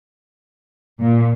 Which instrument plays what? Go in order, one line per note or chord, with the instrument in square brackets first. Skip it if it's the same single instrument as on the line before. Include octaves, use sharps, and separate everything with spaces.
[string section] A#2